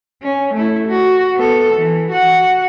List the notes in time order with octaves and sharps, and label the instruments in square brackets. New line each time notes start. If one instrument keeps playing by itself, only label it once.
[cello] C#4
A3 E4
F#4
B3 A4
E3
F#4 F#5